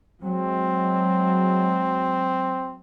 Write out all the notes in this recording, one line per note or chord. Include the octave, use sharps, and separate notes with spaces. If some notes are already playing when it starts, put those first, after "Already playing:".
F#3 G#3 C4